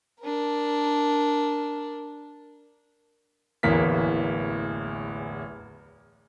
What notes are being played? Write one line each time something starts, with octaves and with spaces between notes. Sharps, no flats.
D4 A#4
D1 A1 E2 A#3 B6